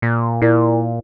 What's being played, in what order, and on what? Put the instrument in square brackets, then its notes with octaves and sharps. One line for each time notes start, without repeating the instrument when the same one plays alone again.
[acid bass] A#2
[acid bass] A#2 [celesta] E4 A#4 D5